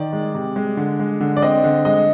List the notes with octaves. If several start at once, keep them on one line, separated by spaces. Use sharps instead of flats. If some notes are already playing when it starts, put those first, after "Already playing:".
Already playing: D#3 D5
G#3
C3
G#3
D3
G#3
D3
D5
C4 D#5
D3
G#3 D#5